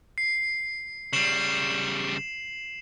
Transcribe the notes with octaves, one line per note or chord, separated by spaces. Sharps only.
C7
C#3 G3 C7 E7 F#7